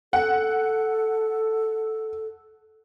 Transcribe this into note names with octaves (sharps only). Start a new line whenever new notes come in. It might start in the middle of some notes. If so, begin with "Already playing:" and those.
A4 F#5